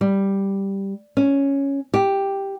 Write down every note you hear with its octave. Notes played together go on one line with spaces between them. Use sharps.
G3
C#4
G4